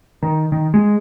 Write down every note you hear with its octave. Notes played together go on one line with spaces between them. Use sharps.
D#3
D#3
G#3